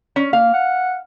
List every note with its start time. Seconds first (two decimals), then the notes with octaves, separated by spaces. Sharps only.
0.16 C#4
0.33 A#3 F5
0.54 F#5